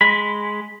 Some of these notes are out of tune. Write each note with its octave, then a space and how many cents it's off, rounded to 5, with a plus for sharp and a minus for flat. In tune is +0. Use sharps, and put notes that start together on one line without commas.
G#3 +0 B5 +0